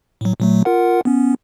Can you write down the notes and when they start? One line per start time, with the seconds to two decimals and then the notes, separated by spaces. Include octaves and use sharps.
0.21 A2 F#3
0.40 A#2 F#3 A3
0.65 F4 A#4 F#5
1.05 B3 C#4